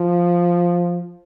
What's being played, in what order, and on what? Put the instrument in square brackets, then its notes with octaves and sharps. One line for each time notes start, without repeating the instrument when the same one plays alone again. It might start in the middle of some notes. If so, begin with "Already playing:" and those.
Already playing: [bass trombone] F3